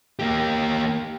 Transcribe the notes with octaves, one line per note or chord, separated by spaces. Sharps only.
A#3 G4